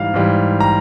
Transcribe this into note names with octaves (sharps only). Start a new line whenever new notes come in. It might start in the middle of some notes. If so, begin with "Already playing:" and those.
Already playing: G#2 E3 G3 F5
G#2 E3 G3
A#5